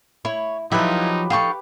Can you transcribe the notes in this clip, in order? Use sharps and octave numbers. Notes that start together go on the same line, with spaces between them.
E4 C#5
F3 F#3 D#4 E4 G4 B4 E5
D#4 A4 F5 G5 C#6